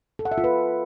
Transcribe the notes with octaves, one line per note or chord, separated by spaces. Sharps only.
A4
F#5
E5
F4
B4